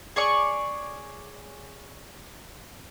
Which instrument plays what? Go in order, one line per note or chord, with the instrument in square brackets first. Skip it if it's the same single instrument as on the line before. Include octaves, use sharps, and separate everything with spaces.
[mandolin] G#4 C#5 D5 C#6